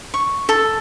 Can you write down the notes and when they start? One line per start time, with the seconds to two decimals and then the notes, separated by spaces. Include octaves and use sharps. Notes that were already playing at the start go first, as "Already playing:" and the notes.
0.14 C#6
0.49 A4